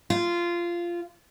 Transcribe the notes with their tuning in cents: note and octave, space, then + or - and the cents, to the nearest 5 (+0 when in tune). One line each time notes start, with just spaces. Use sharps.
F4 -15